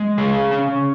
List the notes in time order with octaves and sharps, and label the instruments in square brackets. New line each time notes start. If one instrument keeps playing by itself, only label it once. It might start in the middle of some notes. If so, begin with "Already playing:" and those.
Already playing: [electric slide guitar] G#3
C#3 G#4
C#4